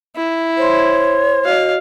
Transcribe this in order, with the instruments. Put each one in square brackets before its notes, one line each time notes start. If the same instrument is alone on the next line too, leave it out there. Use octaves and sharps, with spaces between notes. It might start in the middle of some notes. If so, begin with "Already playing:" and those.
[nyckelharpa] E4
[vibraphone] C5 C6 [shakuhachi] C#5
[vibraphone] F#4 D#5 [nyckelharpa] F5